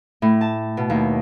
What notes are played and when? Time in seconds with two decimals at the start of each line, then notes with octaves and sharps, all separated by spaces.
0.22 A2
0.41 A5
0.77 B2
0.90 D#2